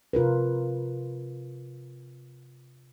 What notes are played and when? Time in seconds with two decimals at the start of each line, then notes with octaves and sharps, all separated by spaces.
0.13 C3 F4 A#4 B4